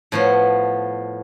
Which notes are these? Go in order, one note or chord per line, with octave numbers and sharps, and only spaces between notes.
A2 F3 B3